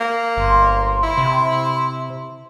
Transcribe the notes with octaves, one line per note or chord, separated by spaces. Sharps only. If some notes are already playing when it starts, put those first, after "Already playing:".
A#3
G1 C6
E4
C3